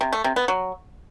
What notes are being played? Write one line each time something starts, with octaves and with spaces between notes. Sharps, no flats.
C3
A3
C3
B3
F#3